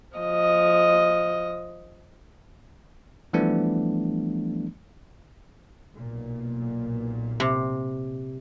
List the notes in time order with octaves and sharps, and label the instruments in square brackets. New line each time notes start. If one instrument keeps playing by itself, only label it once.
[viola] F3 D#5
[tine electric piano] E3 F3 G3 A3 B3 D4
[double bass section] B1 A#2
[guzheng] C3